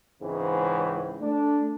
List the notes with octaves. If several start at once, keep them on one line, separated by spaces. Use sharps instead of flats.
C#2 G#2 C#3 E3 C4
A3 D4